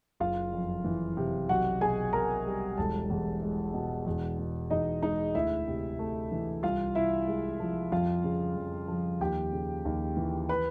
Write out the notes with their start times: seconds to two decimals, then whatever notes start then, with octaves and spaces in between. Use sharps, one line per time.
0.20 F#1 F4 F5
0.53 F2
0.85 E3
1.17 C3
1.49 B1 F#4 F#5
1.81 B2 G#4 G#5
2.13 B1 A#4 A#5
2.46 G3
2.77 E1 A4 A5
3.10 E2
3.42 G#3
3.74 B2
4.06 E2
4.39 B2
4.70 E2 D#4 D#5
5.02 G#3 D#4 D#5
5.35 D2 E4 E5
5.67 C3
5.99 A3
6.32 E3
6.63 C2 F4 F5
6.95 C3 E4 E5
7.28 G#3
7.60 F3
7.92 F2 F4 F5
8.24 C#3
8.56 F2
8.88 F3
9.21 D#2 G4 G5
9.52 C#3
9.85 D#2
10.17 E3
10.49 B4 B5